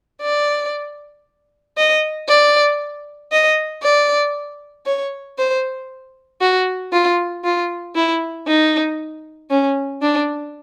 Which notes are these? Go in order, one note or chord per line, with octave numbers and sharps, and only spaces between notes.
D5
D#5
D5
D#5
D5
C#5
C5
F#4
F4
F4
E4
D#4
C#4
D4